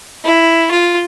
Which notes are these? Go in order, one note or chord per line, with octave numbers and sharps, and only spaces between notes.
E4
F4